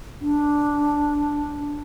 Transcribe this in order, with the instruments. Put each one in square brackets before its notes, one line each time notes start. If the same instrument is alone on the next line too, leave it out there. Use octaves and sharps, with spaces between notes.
[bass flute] D4